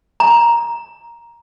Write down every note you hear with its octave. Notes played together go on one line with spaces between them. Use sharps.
A#5